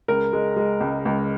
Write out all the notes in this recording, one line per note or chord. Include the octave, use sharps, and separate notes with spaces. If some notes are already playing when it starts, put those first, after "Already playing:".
C#2 A#4
G#3
G#3
C#2
C#2